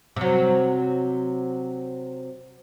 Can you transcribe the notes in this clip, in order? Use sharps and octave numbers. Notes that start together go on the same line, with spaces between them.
C3 F#3